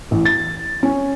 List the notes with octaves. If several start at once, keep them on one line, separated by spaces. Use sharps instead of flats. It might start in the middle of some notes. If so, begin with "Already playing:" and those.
A1
A6
C#4